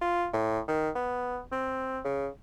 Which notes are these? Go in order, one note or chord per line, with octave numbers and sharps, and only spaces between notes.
F4
A2
D#3
B3
C4
C#3